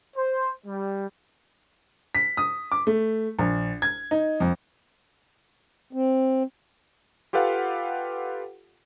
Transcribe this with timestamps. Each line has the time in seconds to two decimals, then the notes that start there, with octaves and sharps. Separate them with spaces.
0.16 C5
0.65 G3
2.15 B6
2.37 D#6
2.72 D6
2.87 A3
3.39 A#1
3.82 G#6
4.11 D#4
4.40 F2
5.93 C4
7.33 F4 G4 A4 B4 F5 F#5